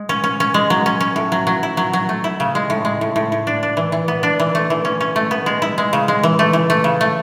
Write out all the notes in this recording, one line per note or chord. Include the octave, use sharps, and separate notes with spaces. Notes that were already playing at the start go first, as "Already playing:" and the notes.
Already playing: G#3
C#4
C#4
C#4
G#3
F#3
C#4
C#4
A2
F#3
F#3
E4
F#3
F#3
A3
E4
C#3
G#3
A2
G#3
A2
A2
A2
D4
D4
E3
E3
B3
D4
E3
A3
E3
C#4
C#4
A3
B3
G#3
E4
G#3
C#3
G#3
E3
A3
E3
A3
C#3
A3